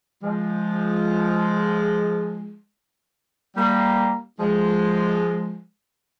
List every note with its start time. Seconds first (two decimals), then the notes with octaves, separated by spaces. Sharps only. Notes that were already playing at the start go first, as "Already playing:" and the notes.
0.22 F3 G#3
3.56 G3 A#3
4.40 F3 G#3